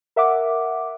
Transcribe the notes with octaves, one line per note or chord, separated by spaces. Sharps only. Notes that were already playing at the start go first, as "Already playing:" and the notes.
A#4 E5 F#5 D6